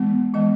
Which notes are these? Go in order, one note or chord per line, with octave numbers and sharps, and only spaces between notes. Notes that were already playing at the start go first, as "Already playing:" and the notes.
Already playing: E3 G#3 B3
E3 G#3 B3 D#5